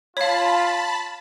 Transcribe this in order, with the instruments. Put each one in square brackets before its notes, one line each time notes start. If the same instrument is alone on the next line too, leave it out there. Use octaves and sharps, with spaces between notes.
[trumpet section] F4 [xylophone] C#5 F5 [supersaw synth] A5 B5